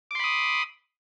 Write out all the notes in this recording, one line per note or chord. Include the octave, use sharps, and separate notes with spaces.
B5 C6 D6 D#6